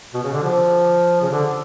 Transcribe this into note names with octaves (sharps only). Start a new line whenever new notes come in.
B2
C#3
D3
F3
C#3
D3